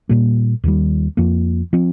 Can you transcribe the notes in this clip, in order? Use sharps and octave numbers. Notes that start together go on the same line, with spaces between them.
A#2 G3 A#3
D#2 D#3 G3
F2 F3 A#3
F3 C4